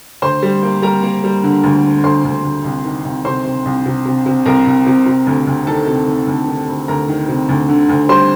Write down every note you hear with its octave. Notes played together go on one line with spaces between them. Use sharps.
D2 C5 C6
G3
A#3
G3 A#4 A#5
A#3
G3
D3
D2
D3
D2 C5 C6
D2
D2
C2
D#3
C2
C3 C5 C6
C3
C2
C3
C3
C3
C2 A#4 A#5
C2
C3
C3
D2
D2
D#3 A4 A5
C3
D#3
D2
D#3
D2
D2 A#4 A#5
D#3
C3
D2
D3
D2
G3 C5 C6